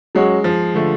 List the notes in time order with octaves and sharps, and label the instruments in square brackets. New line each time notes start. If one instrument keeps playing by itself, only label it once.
[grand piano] F#3 C#4 F#4 C#5 [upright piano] G#3
[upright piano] F3
[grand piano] D3 F3 A3